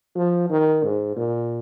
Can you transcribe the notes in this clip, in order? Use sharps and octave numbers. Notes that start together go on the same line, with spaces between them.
F3
D#3
G#2
A#2